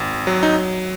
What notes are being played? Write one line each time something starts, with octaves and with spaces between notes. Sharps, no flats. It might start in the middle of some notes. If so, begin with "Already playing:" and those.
Already playing: G#1
F#3
D#4